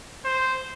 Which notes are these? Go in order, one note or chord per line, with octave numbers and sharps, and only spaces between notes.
C5